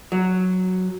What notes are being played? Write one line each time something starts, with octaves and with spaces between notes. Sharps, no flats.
F#3